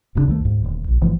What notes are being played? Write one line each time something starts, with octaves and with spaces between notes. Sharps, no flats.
D#1 G2 C#3 D4
D2 D#3 E3 A3
D2 G#2
D#1 D2
A#1
G1 E3 F3 A3